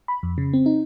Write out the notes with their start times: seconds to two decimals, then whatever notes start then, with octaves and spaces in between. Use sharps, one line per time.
0.08 B5
0.23 F2
0.38 C#3
0.53 C4
0.66 D#4